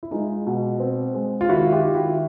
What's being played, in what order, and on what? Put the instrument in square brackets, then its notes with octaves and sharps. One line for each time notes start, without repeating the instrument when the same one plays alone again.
[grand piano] E4
[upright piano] G#3 [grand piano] D#4 F4
[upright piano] B2
C4
G#3
[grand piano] F4
[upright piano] D#3 [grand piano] E4 F#4
[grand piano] F4 G4
[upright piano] D#3
[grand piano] E4 F#4